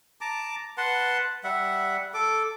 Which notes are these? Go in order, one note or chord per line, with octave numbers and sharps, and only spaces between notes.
A5 A#5 D6
B4 F#5 A5 C6
G3 E5 F#5
A4 D6